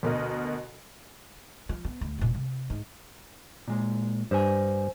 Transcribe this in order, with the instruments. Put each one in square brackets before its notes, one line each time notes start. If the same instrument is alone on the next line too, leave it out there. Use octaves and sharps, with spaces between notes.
[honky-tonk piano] D2 B2 A#4 D#5
[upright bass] F3
B3
D2
E1 A#2
C3
G#2
[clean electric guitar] A#2 G#3
[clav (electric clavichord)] G2 [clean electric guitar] C5 G#5